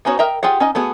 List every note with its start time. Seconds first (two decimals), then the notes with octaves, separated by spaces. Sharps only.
0.05 B3 C#4 D#4 F#4 C#5
0.19 A#4 D#5 E5 G5 A#5
0.43 F4 G4 G#4 F#5
0.60 C#4 D#4 D#5
0.75 A3 B3 F#4 G#4